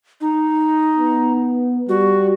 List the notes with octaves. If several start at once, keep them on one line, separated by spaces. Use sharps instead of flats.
D#4
B3
G3 F#4